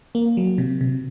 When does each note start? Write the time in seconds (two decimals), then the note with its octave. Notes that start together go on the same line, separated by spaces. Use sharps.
0.15 A#3
0.37 F#3
0.58 C3
0.81 C3